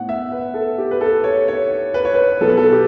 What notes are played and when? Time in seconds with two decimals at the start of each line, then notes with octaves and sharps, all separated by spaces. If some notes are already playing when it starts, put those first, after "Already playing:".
Already playing: A2 B3 F#5
0.09 E5
0.32 B4
0.54 A4
0.78 G4
0.91 B4
1.01 A4
1.24 C#5
1.48 C#5
1.94 B4
2.05 C#5
2.14 B4
2.41 B2 F#3 B3 A4
2.49 B4
2.57 A4
2.72 G4